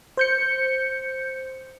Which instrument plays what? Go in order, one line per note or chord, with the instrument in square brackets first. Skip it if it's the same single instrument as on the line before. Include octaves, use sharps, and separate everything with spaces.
[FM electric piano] C5 G6 C#7